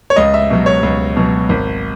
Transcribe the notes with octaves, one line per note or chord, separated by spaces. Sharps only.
C#5
C#2 D#5
E5
B2 F#3
C#5
C#2
B2 F#3
G#1